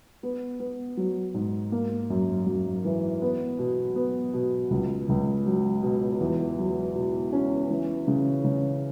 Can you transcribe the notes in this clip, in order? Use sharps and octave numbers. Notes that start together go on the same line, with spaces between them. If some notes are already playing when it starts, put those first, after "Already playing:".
B3
B3
F#3
G#2
A#3
F#2
F#2
E3
B3
B2
B3
B2
C#2
C#2
F#3
B2
E2
F#3
B2
C#4
E3
C#3
C#3